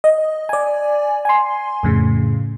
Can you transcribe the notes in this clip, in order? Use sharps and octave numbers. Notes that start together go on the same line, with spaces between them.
D#5
D5 G#5
G#5 C6
F2 A2 C#3